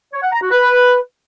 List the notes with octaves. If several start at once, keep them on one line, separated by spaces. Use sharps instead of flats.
C#5
F#5
A#5
F#4
B4